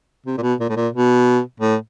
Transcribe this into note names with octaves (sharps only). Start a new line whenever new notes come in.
C3
A#2
B2
A#2
A2
A#2
B2
A2